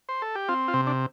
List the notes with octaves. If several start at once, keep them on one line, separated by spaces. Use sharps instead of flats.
C5
A4
G4
C4 F4
F4
C3
D4